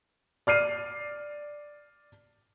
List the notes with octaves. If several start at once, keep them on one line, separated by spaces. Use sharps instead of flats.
D5 F6 C7 D#7